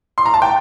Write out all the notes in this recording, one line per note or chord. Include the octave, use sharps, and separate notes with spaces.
C6
A#5
A5
G5